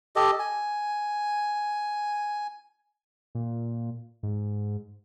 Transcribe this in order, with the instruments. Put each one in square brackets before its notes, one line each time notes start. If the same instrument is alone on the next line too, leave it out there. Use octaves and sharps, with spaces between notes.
[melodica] G4 A4 D#5
G#5
[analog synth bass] A#2
G#2